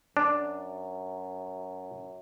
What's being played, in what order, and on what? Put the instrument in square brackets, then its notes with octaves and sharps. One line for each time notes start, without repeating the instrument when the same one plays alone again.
[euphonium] F#2 [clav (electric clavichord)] D4